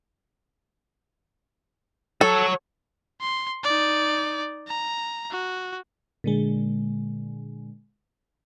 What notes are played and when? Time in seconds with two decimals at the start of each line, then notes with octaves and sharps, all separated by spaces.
2.21 F#4 A4 C#5
3.21 C6
3.64 D#4 D5
4.68 A#5
5.31 F#4
6.24 A#2 D3 G#3